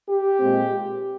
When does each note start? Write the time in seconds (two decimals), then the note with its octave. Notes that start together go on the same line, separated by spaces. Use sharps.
0.09 G4
0.40 A#2 G#3 C4